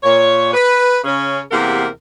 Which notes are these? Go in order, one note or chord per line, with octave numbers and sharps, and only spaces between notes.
A#2 C#5
B4
C#3 C#4
E2 C3 A#3 G4 A#4 F#5